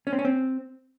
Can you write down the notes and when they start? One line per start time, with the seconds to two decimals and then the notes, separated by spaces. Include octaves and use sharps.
0.07 C#4
0.13 C4
0.19 C#4
0.25 C4